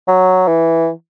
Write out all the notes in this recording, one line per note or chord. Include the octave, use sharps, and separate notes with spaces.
F#3
E3